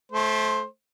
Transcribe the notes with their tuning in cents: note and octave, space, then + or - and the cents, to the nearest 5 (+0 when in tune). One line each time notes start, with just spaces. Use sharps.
A3 -20 C5 +15